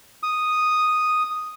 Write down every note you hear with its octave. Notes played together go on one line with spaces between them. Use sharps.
D#6